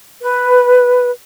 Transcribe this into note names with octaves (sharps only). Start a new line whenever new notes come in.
B4